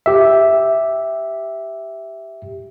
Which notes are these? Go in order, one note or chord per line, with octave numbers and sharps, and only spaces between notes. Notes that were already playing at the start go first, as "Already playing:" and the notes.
G4 E5